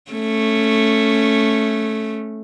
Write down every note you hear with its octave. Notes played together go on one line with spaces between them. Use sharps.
A3 C#4